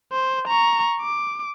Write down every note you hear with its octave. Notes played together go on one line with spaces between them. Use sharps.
C5
A#5 C#6
D6